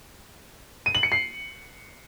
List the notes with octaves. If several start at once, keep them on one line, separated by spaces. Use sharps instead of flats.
D#7
F#7
C#7
C7